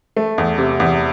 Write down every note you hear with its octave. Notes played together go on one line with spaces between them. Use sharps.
A3
E2
C3
E2